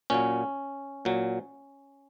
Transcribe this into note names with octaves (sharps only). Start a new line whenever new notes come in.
A#2 F#3 C#4
A#2 F#3